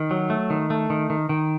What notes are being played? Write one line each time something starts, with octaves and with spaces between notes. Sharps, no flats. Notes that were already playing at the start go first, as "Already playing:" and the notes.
Already playing: D#3
F#3
A3
D#3
A3
D#3
D#3
D#3